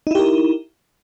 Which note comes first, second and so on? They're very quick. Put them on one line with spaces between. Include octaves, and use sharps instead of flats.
D#4 E4 G4 A#4